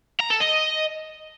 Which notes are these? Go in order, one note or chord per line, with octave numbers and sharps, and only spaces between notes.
A#5
A4
D#5